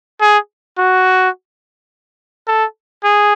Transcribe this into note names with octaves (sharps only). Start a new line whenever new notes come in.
G#4
F#4
A4
G#4